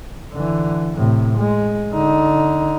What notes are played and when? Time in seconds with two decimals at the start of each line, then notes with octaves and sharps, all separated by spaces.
0.33 D3 E3
0.95 A2 C3
1.38 G#3
1.93 D3 D#4